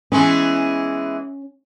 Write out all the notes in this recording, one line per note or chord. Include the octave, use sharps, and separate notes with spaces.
E3 G#3 B3 C#4